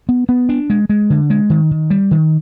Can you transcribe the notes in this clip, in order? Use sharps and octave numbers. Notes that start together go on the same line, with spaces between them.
B3
B3
D4
G#3
G#3
D3
G#3
D#3
D#3
G3
D#3